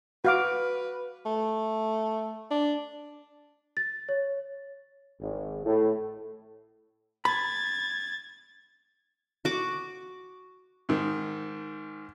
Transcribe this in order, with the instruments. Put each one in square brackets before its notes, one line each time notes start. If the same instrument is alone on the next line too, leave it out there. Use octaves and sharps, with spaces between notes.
[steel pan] F#4 F5 D6 [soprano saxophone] B4
[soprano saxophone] A3
D4
[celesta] A6
C#5
[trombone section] G#1
A2
[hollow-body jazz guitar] B5 [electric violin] G#6 A6
[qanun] F#4 D6
[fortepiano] G#2 D#3